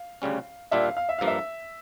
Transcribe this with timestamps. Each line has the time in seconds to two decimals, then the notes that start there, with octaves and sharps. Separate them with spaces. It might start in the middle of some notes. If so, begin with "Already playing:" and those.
Already playing: F5
0.22 D2 C#3 G3 C#4
0.71 A#2 G3 D4 F4 E5
0.83 F5
0.97 F5
1.09 E5
1.19 G2 F3 A#3 F5
1.27 E5